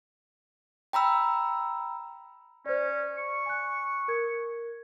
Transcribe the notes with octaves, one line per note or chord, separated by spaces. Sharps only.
G5 A#5 B5 E6
C#4 C5 D5
C#6
G#5 F#6
A#4 G#6